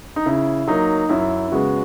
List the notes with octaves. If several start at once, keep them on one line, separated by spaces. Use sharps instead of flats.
D#4
C#3 E4
F#3 A#3 D#4
F#2 E4
C#3 G#3 B3 F#4